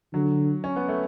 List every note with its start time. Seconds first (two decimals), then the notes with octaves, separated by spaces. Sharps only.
0.14 D3 F#3
0.64 C#4
0.76 B3
0.88 A3